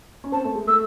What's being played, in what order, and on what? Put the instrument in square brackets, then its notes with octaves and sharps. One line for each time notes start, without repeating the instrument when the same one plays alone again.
[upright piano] C#4
[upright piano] C4 [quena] A5
[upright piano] A3
G#3
[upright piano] A3 [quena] E6